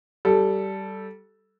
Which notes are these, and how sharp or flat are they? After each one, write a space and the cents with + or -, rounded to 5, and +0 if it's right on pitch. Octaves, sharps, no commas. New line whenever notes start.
G3 -15 A4 +0